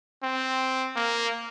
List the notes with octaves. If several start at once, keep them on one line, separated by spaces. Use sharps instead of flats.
C4
A#3